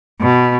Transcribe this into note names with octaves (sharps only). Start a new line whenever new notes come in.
B2